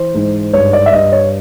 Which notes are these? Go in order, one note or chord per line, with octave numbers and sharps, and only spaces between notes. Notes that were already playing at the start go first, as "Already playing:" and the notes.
Already playing: E3 C5
G#2
G2 C#5
D5
E5
G2 D#5
C#5